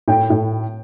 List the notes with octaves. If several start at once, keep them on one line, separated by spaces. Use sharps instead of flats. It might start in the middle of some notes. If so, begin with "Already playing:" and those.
A2 G5
A2